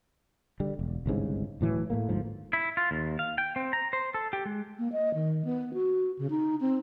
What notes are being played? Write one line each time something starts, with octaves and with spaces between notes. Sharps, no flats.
D3 G3
E1
G1 C2 G#2 C#3
D1 A2 E3 F#3
A2 A3 A#3
G1 D2 G#2 F3
E4
F4
D#2
F5
G5
C4
A#5
C5
A4
G4
G#3
A#3
D#5
D#3
B3
F#4
C#3
D#4
C4